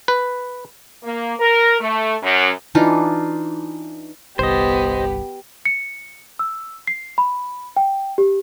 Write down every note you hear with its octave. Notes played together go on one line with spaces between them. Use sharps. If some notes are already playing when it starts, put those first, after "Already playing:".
B4
A#3
A#4
A3
F#2
E3 D4 D#4 F4
G1 C2 B3 G4 C5 D#5
C#7
E6
C7
B5
G5
G4